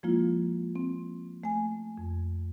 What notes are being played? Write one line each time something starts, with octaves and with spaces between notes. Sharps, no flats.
F3 G#3 A#3 E4 F4
C4
A3 G#5
F2